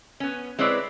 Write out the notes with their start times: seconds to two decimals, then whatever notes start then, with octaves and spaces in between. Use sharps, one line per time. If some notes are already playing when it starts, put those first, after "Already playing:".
0.20 B3 C#4
0.59 G#3 C4 E4 B4 C#5 D5